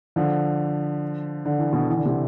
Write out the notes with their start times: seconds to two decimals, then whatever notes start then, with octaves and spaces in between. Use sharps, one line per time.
0.16 D3 F3
1.45 D3
1.59 E3
1.73 B2 D3
1.88 E3
1.97 D3
2.05 C3